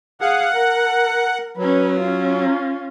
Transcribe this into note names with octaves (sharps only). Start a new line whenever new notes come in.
G#4 F5 F#5
A#4
F#3 C#4 B4
C#4 F4